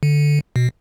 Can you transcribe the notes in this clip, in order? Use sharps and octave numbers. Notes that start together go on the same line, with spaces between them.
D3
B2